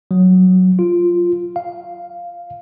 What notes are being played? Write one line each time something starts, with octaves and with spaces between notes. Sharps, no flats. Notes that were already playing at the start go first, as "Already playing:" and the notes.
F#3
F4
F5